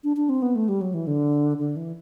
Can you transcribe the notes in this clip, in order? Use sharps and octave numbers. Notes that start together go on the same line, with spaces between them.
D4
D4
C4
B3
A3
G3
F#3
E3
D3
D3
E3